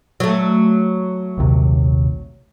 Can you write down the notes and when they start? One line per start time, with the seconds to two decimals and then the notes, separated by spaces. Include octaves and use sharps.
0.20 F#3 A3
1.38 A#1 D#2 C3